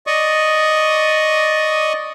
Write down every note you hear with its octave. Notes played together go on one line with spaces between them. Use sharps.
D5 D#5 C#6 D#6